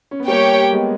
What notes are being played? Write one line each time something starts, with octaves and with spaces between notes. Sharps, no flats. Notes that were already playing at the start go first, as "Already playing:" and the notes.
C#4
B3
G3 A#3 G4 C#5 G5
G#3 B3